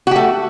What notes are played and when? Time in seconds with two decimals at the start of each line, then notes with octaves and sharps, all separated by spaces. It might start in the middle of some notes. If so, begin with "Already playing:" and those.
0.07 F#4
0.11 G4
0.16 A3